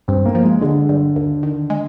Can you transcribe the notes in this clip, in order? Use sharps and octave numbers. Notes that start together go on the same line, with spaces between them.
G2 C4
A#3
F3
G#3
D3 G#3
G2
D#2
D#3
G#3